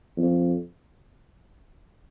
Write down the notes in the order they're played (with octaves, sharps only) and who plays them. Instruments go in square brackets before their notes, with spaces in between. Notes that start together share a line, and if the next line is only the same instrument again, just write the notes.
[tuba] F2